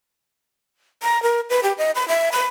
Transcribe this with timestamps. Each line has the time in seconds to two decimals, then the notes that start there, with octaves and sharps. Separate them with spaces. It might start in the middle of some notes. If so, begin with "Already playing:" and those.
1.03 A#5
1.23 A#4
1.50 B4
1.63 G4
1.78 D#5
1.95 B5
2.08 E5
2.32 B5